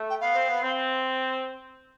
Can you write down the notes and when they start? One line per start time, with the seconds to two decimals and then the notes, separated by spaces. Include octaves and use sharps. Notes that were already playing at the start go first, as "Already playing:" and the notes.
Already playing: A3
0.10 G5
0.21 B3 F5
0.34 C4
0.48 B3
0.62 C4